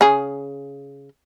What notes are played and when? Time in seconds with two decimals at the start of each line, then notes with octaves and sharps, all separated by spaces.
0.01 C#3 G#4